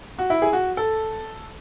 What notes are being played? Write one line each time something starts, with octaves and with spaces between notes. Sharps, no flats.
F#4
E4
G#4
F#4
A4